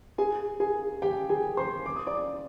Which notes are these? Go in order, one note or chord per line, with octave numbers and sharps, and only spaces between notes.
G#4 G#5
G#4 G#5
G4 G5
G#4 G#5
C5 C6
D6
D#6
D5 D6